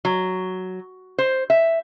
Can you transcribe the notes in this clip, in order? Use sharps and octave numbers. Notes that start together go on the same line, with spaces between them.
F#3
C5
E5